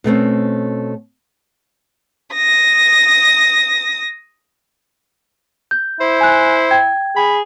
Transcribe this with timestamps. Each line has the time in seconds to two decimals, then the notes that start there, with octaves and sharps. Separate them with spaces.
0.04 B2 A3 C4 C#4
2.34 D#6 A#6
5.71 G6
6.00 E4 C5
6.21 G#5 F#6
6.71 G5 G#6
7.16 G#4 B5